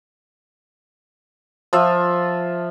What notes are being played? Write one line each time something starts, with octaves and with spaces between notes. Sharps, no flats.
F3 F4 E5